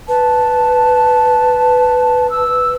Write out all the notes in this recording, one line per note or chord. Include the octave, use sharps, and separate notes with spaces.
B4 A5
E6